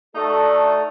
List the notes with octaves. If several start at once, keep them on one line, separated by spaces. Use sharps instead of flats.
A3 D#4 F#4 A4 D5